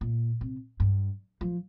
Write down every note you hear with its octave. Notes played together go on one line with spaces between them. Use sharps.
A#2
C3
G2
F3